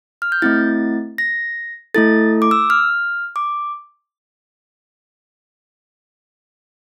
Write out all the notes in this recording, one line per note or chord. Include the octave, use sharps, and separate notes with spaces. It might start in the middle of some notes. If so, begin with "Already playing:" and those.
F6
G6
A3 C4 E4 A6
A#6
A3 E4 A4 A6
D6
E6
F6
D6